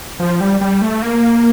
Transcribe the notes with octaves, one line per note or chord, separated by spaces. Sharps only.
F3
G3
G3
A3
A#3